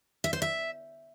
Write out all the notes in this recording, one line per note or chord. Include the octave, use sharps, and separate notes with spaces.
E5
C5
E5